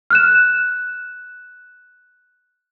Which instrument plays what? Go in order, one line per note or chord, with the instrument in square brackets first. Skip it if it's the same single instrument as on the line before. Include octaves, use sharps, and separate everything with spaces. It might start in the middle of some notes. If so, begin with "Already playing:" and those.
[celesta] F6 F#6 E7